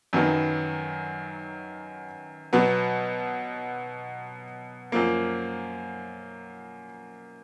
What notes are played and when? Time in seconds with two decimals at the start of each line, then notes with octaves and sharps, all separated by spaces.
0.13 F#2 D#3 F#3 B3
2.53 B2 F#3 B3
4.92 F#2 F3 A#3